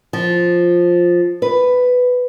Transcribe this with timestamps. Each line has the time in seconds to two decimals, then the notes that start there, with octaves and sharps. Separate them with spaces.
0.13 F3
1.42 B4